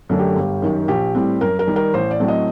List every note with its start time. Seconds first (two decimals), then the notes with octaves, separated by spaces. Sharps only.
0.09 F#2 D3 F#3 A3
0.19 G4
0.36 G1
0.62 F#2 D#3
0.88 A#1 G4
1.15 A2 G3 C4
1.41 F#2 A#4
1.59 A#4
1.67 D#3 G3
1.76 A#4
1.94 A1 C5
2.11 D5
2.20 A2 F#3 A3 C4
2.28 D#5